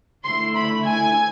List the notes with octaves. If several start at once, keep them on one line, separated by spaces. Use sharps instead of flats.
D3 A3 E4 C6
B5
G#5